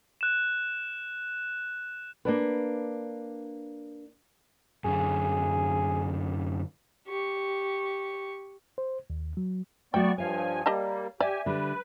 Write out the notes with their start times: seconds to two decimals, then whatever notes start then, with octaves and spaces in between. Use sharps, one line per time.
0.21 F#6 E7
2.25 A#3 D4 B4
4.85 F#2 D3 G#4
7.08 G4 C#6
8.78 C5
9.10 D#2
9.37 F#3
9.94 F#3 A3 B3 F#4 D5 G5 C#6
10.18 G2 F3 C#5 F5 G#5
10.66 G3 A#3 G4 D#5 A5
11.20 G4 D5 E5 G#5
11.46 D3 G3 B4